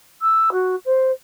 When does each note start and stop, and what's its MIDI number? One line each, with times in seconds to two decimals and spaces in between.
0.21 0.49 88
0.51 0.75 66
0.85 1.11 72